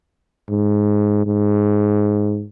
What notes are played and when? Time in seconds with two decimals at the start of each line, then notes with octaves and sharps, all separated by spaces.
0.49 G#2
1.26 G#2